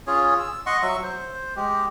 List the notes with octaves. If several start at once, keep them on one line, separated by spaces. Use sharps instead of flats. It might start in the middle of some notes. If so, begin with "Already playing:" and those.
C#4 F4 G#4 C#5
E6
D#5 F#5 C6 C#6
F#3 E5 C#6
C5
G#3 G4